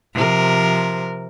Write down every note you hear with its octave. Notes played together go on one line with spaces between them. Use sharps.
C3 F3 A#4